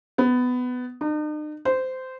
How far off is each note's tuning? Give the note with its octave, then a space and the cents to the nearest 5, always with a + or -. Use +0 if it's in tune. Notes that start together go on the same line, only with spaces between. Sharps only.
B3 +15
D#4 -45
C5 -15